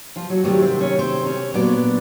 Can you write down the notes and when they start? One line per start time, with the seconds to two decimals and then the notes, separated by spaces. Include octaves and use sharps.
0.16 F3 F4
0.30 F#3 F#4
0.44 C3 D#3 F#3 G3 A3 C4 G4
0.62 C4 C5
0.80 C#4 C#5
0.99 C4 C5
1.26 C#4 C#5
1.54 A#2 F#3 B3 D4 D5